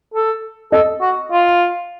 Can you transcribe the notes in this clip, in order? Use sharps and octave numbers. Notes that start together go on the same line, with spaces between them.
A4
A4 D#5
F#4
F4